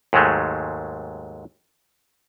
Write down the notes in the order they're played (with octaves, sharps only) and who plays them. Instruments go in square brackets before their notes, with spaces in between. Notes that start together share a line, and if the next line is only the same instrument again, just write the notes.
[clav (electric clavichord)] D#2 G#2 F#3 G#3 A3